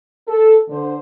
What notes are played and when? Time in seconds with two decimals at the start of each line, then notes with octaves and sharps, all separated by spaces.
0.28 A4
0.69 D3 C5